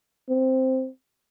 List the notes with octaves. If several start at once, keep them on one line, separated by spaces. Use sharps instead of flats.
C4